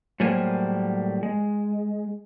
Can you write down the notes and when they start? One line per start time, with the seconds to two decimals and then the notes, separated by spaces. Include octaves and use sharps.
0.20 A2 F#3 G3 A#3 C5 G#5
1.23 G#3